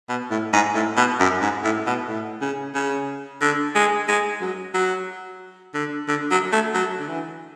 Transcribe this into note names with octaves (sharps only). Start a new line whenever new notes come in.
B2
A2
G#2
A2
B2
F#2
G#2
A2
B2
A2
C#3
C#3
D3
G#3
G#3
F#3
F#3
D3
D3
F#3
A3
F#3
D3
E3